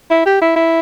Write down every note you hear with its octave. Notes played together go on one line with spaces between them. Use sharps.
E4
G4
E4
E4